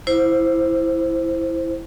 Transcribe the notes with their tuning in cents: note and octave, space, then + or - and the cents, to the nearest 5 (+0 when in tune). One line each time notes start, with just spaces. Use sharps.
E4 +0 C5 +0